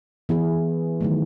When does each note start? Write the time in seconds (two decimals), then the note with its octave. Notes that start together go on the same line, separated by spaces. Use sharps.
0.29 E3 B3 E4 G#4
1.01 D#3 F#3 A3